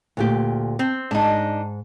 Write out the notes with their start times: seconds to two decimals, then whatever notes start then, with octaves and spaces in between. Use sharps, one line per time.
0.17 D2 A#2 G4
0.79 C4
1.11 G#2 D4 D#4